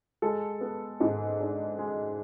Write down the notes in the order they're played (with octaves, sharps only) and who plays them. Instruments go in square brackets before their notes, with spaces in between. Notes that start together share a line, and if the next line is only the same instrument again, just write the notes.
[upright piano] G#3 A4
B3
G#2
D4
G#3